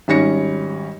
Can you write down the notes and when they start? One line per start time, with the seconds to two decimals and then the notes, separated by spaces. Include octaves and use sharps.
0.08 G#1 G3 C#4 A#6 C#7